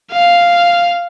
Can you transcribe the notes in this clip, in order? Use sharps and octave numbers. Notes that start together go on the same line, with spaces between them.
F5